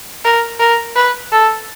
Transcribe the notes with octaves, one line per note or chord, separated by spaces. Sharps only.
A#4
A#4
B4
A4